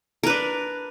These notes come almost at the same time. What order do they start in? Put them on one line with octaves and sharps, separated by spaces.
A#4 B4 D4